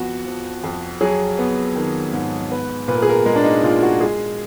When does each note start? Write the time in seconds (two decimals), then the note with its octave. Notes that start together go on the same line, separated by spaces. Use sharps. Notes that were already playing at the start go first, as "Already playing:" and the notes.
Already playing: F2 B3 F#4
0.25 F3
0.64 F2
1.01 F#3 G#4
1.38 B3
1.76 D#3
2.13 G#2
2.51 B3 B4
2.88 A#2 B4
2.95 A#4
3.02 G#4
3.09 A#4
3.26 G#3 A#4
3.36 D4
3.44 D#4
3.63 A#2 F4
3.82 F#4
4.01 G#3 G#4